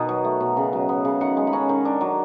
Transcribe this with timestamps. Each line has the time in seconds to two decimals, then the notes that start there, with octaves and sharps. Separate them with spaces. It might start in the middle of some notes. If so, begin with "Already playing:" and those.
Already playing: B2 D#3 B3 D#4
0.09 F#3
0.24 A3
0.40 B2
0.57 C#3
0.73 F#3
0.89 B3
1.05 C#3
1.21 D#3 F#5
1.37 G#3
1.47 B5
1.53 C#4 A#5
1.69 D#3
1.85 D4
2.01 F#3